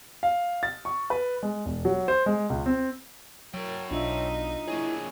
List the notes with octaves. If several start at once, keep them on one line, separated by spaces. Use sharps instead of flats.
F5
A6
C#6
B4
G#3
E1
F#3
C5
G#3
C#2
C4
F#3 A#4 C#5 G5
B1 D4 D#4 F4 E5
A#3 E4 G#4 C#5